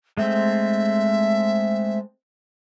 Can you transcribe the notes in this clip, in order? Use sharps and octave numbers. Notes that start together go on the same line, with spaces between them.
G#3 A3 C4 E5